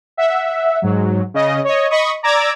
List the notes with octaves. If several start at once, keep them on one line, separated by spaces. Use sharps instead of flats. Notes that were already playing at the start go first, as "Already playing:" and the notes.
E5 F#5
G#2 F#3
C#3 D#5
C#5 D#5
D#5 B5 C#6 D#6
D5 A#5 D6 E6 G#6